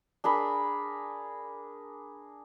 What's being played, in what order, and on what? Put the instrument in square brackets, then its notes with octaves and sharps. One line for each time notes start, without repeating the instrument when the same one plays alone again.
[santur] D4 G#4 A#4 B5